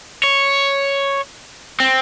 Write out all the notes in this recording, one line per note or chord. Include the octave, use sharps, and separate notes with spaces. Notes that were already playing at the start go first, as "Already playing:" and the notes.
C#5
C4